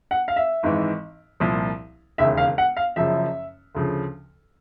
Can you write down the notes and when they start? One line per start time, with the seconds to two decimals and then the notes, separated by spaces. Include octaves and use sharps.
0.11 F#5
0.28 F5
0.36 E5
0.63 G#1 G#2 E3
1.40 C2 A#2 F3
2.18 E1 D#2 C#3 E5
2.37 F5
2.58 F#5
2.77 F5
2.96 F#1 F#2 C#3 F3 E5
3.75 D2 C#3 F3